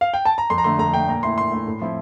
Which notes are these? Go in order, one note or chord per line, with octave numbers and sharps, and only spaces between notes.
F5
G5
A5
A#5
F2 C6
A#5
D3 A3 C6
F2 A#5
D3 A3 G5
A#2 A#5
A3 E4 C6
A#2 C6
A3 E4
A2
F3 C4 E4